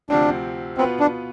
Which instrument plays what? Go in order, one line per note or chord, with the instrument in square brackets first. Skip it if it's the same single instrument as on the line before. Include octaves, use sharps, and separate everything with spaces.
[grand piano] D2 C3 F3 C4 [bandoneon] D4
[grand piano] B2 B3 F4 B4 [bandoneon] C4
[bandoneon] D4